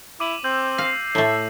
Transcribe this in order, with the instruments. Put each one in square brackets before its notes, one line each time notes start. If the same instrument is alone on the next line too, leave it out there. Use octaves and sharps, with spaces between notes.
[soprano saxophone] E4 [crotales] D6 D#7 F#7
[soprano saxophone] C4 [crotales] E6 G6 F#7
[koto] F5 [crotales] A#6 C7
[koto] A2 A3 [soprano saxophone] E5